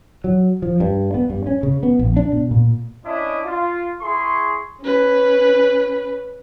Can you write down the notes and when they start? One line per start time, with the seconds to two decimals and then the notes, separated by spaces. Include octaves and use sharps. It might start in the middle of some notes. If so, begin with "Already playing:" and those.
0.24 F#3
0.62 F3
0.80 G2
1.14 B3
1.30 G2
1.47 C#4
1.63 C#3
1.83 B3
1.99 A#1
2.17 D4
2.33 B2
2.51 A#2
3.05 C#4 D4 E4 D#5 D6
3.45 F4
4.01 E4 G#4 C6 C#6
4.82 C#4 B4